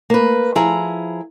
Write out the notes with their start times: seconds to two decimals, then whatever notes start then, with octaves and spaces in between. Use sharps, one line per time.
0.10 A#3 B4
0.55 F3 E4 G#4 A#5